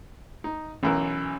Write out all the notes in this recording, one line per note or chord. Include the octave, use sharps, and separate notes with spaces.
D#4
B1 E3 C#4 A#4